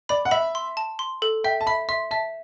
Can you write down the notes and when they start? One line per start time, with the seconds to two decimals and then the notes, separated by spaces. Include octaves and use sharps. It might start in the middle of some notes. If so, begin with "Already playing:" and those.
0.09 D5 B5
0.25 F#5
0.31 E5 B5
0.55 C6
0.77 A5
0.99 C6
1.22 A4
1.44 E5 G5
1.61 A5
1.67 E5 B5
1.89 E5 C6
2.11 E5 A5